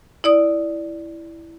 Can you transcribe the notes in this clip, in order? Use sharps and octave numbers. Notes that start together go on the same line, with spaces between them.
E4 D5 D#6